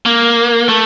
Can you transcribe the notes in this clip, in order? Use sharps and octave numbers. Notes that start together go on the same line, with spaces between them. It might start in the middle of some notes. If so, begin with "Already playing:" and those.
A#3
A3